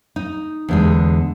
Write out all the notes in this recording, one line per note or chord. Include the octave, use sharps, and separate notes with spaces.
D#4
E2 D3 G#3